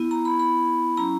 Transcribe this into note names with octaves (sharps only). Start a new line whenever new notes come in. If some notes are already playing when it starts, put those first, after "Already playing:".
Already playing: B3 E4
A#5
B5
B5
F#3 C#4 E4 A#5